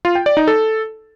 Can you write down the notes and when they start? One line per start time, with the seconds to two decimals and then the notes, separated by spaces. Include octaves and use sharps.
0.05 F4
0.15 G5
0.26 D5
0.37 D#4
0.47 A4